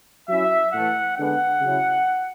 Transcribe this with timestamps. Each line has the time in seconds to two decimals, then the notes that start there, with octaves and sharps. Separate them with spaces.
0.29 F#3 C#4 E4 E5
0.72 A2 E3 A3 F#5
1.17 D3 G#3 B3 D4 F#5
1.61 C#3 F#3 C#4 E4